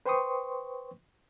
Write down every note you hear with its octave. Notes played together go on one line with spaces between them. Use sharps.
B4 C5 G5 C6 C#6 D#6